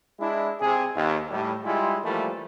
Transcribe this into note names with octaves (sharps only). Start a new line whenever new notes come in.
G#3 D4 E4
C3 G#4
D#2
A2 G3
G3 G#3 E4 F4 G#4
E3 F3 G3 A3 A#3